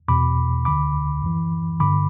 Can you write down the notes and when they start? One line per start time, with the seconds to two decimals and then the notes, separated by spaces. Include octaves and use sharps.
0.08 E2 B2 B5 D6
0.65 D2 D3 B5 D6
1.22 F#2 E3
1.80 G2 D3 B5 D6